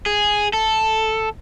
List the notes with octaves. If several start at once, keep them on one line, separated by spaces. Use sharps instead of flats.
G#4
A4